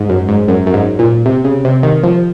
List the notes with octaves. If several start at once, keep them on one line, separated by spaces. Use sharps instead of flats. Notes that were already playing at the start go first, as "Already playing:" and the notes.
Already playing: G#2
F#2
G#2
F#2
F#2
G#2
A#2
C3
C#3
C3
D#3
F3